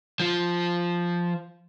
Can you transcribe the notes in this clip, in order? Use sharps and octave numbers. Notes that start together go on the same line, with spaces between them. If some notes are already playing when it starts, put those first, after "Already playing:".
F3 F4